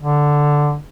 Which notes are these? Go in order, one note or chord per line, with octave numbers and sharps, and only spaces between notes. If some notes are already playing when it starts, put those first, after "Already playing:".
D3